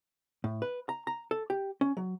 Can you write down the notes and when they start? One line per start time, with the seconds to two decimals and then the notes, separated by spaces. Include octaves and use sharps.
0.44 A2
0.62 B4
0.89 A#5
1.07 A#5
1.31 A4
1.50 G4
1.81 C#4
1.97 F#3